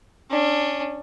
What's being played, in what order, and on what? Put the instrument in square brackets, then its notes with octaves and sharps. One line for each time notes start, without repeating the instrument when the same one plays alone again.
[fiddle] C#4 D4